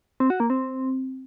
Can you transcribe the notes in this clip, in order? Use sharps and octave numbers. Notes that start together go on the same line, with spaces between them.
C4
F#4
A#3
C4